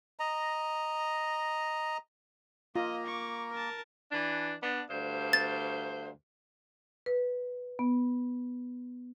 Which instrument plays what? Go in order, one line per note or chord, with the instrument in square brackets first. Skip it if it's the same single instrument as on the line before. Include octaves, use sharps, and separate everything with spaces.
[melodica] D#5 A#5
[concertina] A#3 A#5 [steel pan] F4 [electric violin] D#5
[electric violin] C#6 D6
A#4 A5
[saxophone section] E3 D4
B3 D4
D2 G2 C5
[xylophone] A6
[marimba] B4
B3